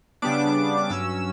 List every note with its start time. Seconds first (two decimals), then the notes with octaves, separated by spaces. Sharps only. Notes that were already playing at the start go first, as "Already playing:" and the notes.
0.22 C#3 G3 B3 D4 D6
0.90 G2 F#3 C#4 E6